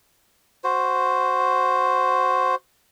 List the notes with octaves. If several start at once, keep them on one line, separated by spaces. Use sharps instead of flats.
F#4 C5